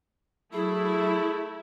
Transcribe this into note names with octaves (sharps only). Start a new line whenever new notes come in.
F#3 A3 E4 G#4